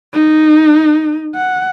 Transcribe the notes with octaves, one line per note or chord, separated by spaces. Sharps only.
D#4
F#5